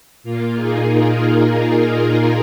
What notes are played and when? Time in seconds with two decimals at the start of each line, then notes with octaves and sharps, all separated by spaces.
0.23 A#2 A#3 F4
0.55 D#4 G#4
0.86 F4 A#4